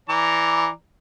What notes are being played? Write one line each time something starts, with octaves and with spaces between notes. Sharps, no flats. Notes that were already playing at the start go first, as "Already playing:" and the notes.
E3 D5 A#5